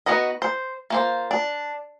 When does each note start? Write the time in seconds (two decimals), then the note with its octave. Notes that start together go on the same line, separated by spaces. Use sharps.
0.06 B3 D#4 F#4 B4 D#5
0.42 C5
0.90 A#3 F4 C5
1.31 D4